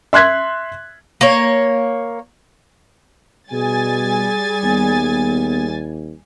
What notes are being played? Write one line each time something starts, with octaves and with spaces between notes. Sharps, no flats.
E5 C6 F#6 G#6 B6
A#3 C#5
B2 G3 G#4 G#5 A6
D#2 B3